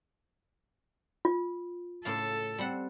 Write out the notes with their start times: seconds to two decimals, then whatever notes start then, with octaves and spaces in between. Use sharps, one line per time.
1.25 F4
2.05 A2 C#3 A4 F5
2.58 G3 C4 F#5